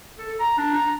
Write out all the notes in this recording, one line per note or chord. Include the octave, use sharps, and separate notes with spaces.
A4
A#5
D4
A#5